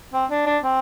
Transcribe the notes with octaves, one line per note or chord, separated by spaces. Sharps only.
C4
D4
D4
C4